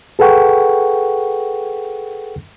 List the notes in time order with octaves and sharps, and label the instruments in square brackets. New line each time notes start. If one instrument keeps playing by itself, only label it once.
[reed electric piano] G#4 A4 B4 F#5 G5 C#6